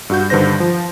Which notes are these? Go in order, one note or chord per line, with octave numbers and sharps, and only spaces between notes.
G2 F#4 G6
G2 D3 D#3 B4 C5 A#6
F3